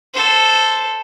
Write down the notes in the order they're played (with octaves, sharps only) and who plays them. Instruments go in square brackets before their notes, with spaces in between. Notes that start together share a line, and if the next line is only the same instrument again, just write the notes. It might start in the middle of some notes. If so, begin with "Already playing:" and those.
[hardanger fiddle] A4 C5